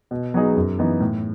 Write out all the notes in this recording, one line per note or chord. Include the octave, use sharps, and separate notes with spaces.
B2
F#3 B3 D#4 G#4
F#2
E3 B3 D#4
A2